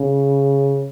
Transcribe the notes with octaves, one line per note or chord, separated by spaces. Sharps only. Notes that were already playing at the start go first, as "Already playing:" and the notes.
Already playing: C#3